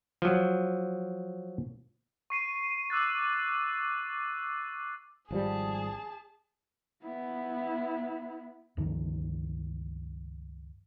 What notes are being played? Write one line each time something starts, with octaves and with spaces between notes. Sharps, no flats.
F3 F#3
C#6 C7 D#7
D6 E6 F#6 A6
G#1 F3 G3 G#4 A5
B3 E4
C#2 G2 D#3 F3